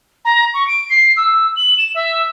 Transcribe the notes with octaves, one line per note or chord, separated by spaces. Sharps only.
A#5
C#6
D7
C7
E6
F#7
E7
E5